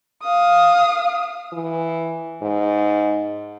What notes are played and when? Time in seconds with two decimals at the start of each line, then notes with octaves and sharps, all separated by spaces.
0.23 F5 D#6
1.53 E3
2.42 G#2